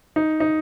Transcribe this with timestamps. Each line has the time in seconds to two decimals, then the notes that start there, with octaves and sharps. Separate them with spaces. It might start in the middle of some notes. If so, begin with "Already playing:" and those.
0.16 D#4
0.40 D#4